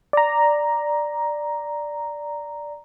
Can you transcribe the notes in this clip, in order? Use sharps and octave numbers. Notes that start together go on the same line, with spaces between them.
D5 A#5